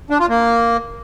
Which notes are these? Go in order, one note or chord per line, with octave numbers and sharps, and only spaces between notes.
D4
F4
A#3